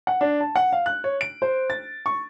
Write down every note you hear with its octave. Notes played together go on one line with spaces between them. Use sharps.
F#5
D4
A5
F#5
F5
F#6
C#5
D7
C5
A6
C#6